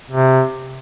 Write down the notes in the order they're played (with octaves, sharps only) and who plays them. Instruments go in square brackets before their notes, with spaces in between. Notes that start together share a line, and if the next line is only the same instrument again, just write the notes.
[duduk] C3